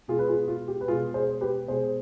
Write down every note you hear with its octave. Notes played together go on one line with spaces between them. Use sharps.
B2 G#3 F4 G#4
B4
F4 G#4
F4
G4
B4
B2 G#3 F4 G#4
G#4 C5
G4 B4
B2 G#3 G#4 C5